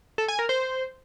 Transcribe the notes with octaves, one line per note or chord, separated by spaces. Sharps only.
A4
G#5
A#4
C5